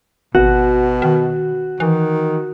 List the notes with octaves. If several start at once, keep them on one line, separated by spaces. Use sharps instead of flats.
G#1 B2 F#4
D#3
D#3 E3